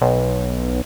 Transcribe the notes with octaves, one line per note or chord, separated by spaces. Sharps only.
B1